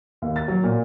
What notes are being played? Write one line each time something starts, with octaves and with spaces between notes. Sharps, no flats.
D#2
A6
F#3
A#2